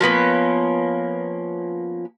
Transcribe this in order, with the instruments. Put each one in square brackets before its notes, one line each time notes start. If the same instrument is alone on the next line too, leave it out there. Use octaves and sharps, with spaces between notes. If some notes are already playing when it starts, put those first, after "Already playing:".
[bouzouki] F3 A#3 B3 C#4